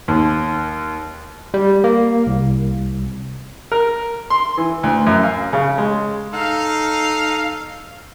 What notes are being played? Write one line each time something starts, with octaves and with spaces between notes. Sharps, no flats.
D#2
G3
A#3
C2
A#4
C6
E3
D2
F#2
F5
C#3
G#3
D#4 A4 F5